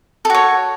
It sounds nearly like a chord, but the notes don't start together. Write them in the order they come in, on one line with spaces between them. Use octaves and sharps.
A4 F#4 C#5